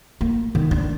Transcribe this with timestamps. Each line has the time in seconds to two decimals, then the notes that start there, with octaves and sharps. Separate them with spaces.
0.21 A#3
0.55 D#3
0.71 D4